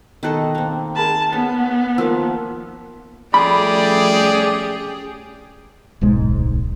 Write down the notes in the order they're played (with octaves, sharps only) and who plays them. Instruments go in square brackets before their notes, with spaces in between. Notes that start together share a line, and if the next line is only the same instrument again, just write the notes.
[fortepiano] B2 F#6 [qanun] D#3 A4 D#5
[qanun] A#3 C4
[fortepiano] G#4 A#4 B5 [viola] A5
[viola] B3 [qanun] C#4
[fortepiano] D#3 A#3 E6 [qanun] F3 D6
[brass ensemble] F3 G3 A3 [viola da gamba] C#4 G4 G#4 [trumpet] D5 [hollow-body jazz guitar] B5
[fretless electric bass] D1 B1 G#2 G#3